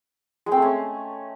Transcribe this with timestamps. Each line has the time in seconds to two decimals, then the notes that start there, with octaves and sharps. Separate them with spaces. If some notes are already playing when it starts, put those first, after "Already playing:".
0.46 G#3
0.52 C4
0.57 A3
0.62 C#4